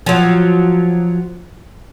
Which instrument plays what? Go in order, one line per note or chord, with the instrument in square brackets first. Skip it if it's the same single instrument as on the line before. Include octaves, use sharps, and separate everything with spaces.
[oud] F3 F#3